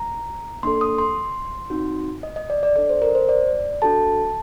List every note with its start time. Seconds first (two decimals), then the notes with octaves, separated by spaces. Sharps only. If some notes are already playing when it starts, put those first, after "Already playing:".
Already playing: A#5
0.63 A#3 D4 A4 C6
0.81 D#6
0.98 C6
1.70 C4 D#4 F#4
2.23 D#5
2.36 D#5
2.50 D5
2.63 D5
2.76 D4 A4 D5
2.89 C5
3.02 A#4
3.15 C5
3.29 D5
3.82 D4 F#4 A4 A5